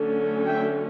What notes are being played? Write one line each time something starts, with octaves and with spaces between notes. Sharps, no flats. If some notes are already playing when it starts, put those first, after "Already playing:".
Already playing: D3 F#3 A3 C#4
E5 G5